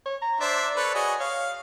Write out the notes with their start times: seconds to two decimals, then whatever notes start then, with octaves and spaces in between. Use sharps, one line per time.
0.06 C#5
0.22 A#5
0.41 D4 C5 D5 E5
0.76 A4 B4 C#5
0.94 F#4 G#4 D#5
1.20 C#5 F5